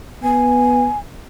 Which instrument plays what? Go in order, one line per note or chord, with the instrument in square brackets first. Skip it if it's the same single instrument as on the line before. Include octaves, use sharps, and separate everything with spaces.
[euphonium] B3 [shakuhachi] G#5